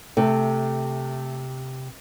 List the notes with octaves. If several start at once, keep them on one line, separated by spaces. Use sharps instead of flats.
C3 A3